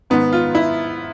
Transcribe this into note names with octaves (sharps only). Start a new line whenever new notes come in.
G#2 D#3 B3
F4
E4